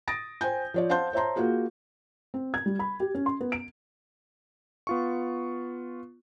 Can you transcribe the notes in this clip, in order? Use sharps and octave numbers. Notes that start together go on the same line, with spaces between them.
D#6 A6 A#6 D7
C5 G5 G#5 G6
F3 C#5 D5
C5 F5 F#5 A5 C6 G6
C5 C#5 E5 A5 A#5 C6
A#3 F4 F#4 G#4
C4
G#6
G3
B5
G4
C#4
C6
B3
D7
B3 F4 C#6